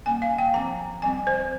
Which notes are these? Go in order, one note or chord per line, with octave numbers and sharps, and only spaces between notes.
G3 A#3 C#4 G#5
F5
G5
F3 C4 A#5
G3 C4 G#5
C5